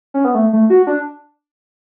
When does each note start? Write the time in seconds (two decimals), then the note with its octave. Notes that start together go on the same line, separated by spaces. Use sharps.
0.14 C#4
0.25 B3
0.35 A3
0.53 A3
0.70 F#4
0.87 D4